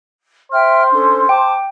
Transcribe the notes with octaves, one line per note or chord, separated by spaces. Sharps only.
C5 E5 G5 F6
C#4 D4 A4
G5 A5 D6